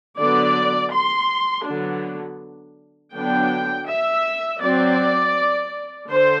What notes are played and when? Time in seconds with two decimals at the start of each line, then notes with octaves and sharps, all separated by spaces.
0.19 D3 F#3 B3 D5
0.93 C6
1.67 D3 F#3 B3 D4
3.15 D3 F#3 B3 D4 G5
3.89 E5
4.62 F#3 C4 D5
6.10 D3 C5